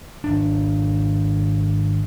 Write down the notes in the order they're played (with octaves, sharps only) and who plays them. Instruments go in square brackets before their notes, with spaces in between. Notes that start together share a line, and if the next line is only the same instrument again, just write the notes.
[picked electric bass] G#1 D4